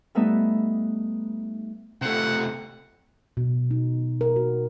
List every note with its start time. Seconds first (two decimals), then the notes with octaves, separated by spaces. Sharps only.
0.15 G3 A3 B3 D#4 B4 E5
2.02 C3 A3 F#5
3.37 B2
3.71 D#4
4.21 A#4
4.36 F#4